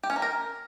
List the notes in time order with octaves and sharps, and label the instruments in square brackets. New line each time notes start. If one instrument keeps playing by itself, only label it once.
[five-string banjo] G4
C#4
A#3
A#4